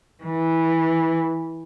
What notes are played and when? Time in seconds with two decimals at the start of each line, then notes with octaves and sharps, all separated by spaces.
0.24 E3